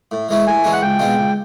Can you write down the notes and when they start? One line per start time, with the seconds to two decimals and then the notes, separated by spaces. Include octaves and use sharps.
0.11 A2
0.29 E3 G#3 C#4 E4
0.47 A2 G#5
0.64 E3 G#3 C#4 E4
0.73 F#5
0.81 C#2 G5
0.99 B2 G#3 C4 F4
1.17 C#2